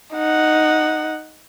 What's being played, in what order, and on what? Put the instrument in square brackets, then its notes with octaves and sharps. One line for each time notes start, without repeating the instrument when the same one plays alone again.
[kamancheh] D#4 F#5